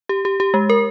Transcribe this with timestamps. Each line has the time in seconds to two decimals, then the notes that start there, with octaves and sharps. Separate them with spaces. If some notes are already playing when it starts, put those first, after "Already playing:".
0.09 G4
0.25 G4
0.40 G4
0.54 G#3
0.70 A#4